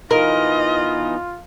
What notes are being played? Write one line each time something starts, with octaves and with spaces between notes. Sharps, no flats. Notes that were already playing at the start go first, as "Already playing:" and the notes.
E3 B3 D#4 F4 A#4 D#5